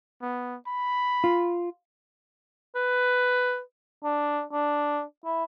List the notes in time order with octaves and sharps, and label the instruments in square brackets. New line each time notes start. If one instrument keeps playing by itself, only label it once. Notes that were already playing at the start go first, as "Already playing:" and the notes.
[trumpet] B3
B5
[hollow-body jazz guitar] F4
[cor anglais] B4
D4
D4
E4